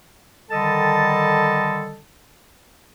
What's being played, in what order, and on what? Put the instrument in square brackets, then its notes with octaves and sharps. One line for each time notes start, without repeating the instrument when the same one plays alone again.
[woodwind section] D3 D#3 G3 A4 D#5 A5